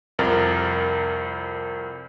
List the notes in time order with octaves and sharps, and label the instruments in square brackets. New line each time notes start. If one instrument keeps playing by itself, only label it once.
[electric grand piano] C2 F2 A#4 A6